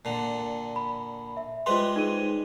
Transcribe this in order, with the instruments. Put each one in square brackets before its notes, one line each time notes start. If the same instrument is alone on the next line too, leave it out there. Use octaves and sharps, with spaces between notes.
[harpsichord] A#2 D3
[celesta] B5
E5
[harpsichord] G3 G#3 B4 [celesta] F4 C5 C6
[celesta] D#4 G#4 D#7